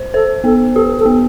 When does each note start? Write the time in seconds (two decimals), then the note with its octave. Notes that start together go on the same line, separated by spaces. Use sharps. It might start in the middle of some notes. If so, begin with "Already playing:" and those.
Already playing: C5
0.14 A4 C5
0.44 B3 A4
0.75 G4 A4
0.99 A4
1.06 B3